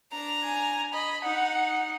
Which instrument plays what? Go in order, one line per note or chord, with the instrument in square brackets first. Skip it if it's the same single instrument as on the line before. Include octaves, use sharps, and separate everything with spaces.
[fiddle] D4 A#5
[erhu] G#5
[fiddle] D#5 [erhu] B5
[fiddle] D#4 [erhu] F#5